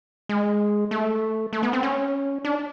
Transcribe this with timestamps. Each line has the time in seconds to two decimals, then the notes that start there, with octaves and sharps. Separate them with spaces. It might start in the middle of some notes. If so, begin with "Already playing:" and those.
0.29 G#3
0.91 A3
1.53 A3
1.63 B3
1.73 C4
1.83 C#4
2.44 D4